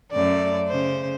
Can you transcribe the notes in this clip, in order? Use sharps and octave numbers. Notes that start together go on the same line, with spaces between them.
F#2 A3 D5
C#3 C5